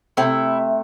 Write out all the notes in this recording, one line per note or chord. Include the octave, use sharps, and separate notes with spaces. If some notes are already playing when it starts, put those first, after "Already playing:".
C3 A3 C4 E4